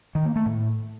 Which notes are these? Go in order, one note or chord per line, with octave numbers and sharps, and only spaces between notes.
D#3
A#3
A3
A2